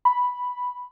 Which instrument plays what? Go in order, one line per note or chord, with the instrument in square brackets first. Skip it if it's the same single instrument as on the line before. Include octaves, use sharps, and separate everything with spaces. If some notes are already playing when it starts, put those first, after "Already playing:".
[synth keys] B5